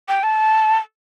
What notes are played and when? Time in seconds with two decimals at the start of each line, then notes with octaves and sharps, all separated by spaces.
0.08 G5
0.23 A5